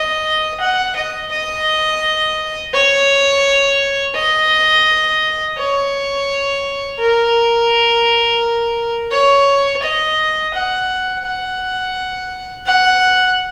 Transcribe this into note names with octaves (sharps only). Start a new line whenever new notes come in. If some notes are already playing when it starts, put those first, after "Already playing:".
Already playing: D#5
F#5
D#5
D#5
C#5
D#5
C#5
A#4
C#5
D#5
F#5
F#5
F#5